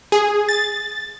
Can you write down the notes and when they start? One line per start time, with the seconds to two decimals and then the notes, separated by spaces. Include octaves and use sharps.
0.12 G#4
0.49 A6